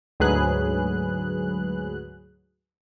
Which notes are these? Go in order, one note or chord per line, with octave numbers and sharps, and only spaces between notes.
D2 G#2 F#3 G#4 B4 F#6